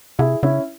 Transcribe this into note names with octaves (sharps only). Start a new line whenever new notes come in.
C3 E4 G#4
C#3 C#4 E4